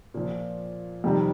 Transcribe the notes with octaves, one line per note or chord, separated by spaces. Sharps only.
A#2 F3
F2 C3 D#3 G3